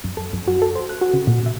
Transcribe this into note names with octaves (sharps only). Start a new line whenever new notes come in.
F#2
A4
F#2
F#4
A4
C5
F#6
F#4
C#3
A#2
E5